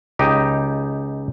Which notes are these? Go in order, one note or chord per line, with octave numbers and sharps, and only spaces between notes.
C#2 D#4 G4 D#5